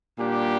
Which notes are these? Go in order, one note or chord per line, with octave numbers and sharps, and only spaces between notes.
A#2 G3 D4 G4